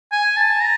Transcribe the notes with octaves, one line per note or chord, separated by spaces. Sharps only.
G#5
A5
A#5